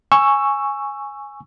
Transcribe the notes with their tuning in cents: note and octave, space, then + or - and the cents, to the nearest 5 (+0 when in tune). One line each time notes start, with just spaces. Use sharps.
G#5 +0 C#6 +0 E6 +10